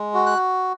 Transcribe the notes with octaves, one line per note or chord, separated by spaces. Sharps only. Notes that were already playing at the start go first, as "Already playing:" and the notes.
Already playing: G#3
F#4
F#6